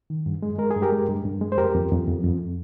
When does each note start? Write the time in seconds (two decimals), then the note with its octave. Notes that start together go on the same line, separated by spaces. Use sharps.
0.10 D#3
0.26 G2
0.42 G#3
0.59 G#3 A#4
0.71 G2 G#4
0.82 G4 A#4
0.92 G#3
1.09 G2
1.25 G2
1.41 G#3
1.52 C5
1.57 F2 G4 A#4
1.75 F2
1.92 F2
2.08 F2
2.24 F2